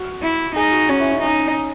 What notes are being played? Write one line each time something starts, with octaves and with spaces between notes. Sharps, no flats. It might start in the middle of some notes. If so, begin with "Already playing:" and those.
Already playing: F#4
E4
D#4 G#4
F#4
C#4 F#4
E4
D#4
C#4 D#4
C#4